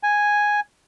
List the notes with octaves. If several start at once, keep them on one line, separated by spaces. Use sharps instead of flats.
G#5